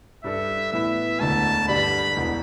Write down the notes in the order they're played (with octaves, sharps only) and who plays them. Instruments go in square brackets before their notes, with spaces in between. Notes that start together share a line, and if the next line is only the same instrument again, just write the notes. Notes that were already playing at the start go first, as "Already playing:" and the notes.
[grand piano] G2 G3 D4 A4 [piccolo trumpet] E5
[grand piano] A2 E3 B3 E4 [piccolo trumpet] E5
[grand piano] E1 D2 D3 [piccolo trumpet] A5
[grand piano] G2 D3 G3 D4 [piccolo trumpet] B5
[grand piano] E1 E2 B2